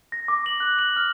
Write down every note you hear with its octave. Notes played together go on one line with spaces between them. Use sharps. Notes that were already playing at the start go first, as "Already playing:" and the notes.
A#6
D6
F#7
F#6
F#7
F6